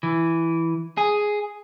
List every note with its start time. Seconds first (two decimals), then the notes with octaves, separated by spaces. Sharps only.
0.03 E3
0.97 G#4